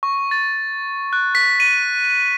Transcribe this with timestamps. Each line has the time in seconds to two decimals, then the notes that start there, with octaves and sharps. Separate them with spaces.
0.03 C#6
0.31 A6
1.13 F#6
1.35 B6
1.60 D#7